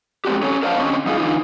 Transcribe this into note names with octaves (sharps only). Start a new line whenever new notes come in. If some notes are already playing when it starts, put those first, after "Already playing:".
G#3 C4 D4 F#4 G4
C#4 A4 C#5
A#4 C5 D5 F5 F#5 A5
D3 C4 C#4 D#5
E2 G#2 D#4 F4 G#4 A#4
D3 E3 D#4 F4